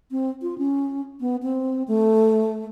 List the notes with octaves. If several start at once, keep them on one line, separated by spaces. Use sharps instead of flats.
C4
F4
C#4
B3
C4
A3